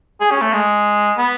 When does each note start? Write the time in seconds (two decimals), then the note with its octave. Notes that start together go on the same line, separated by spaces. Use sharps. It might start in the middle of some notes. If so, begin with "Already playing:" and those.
0.21 G#4
0.31 C#4
0.41 A3
0.53 G#3
1.18 B3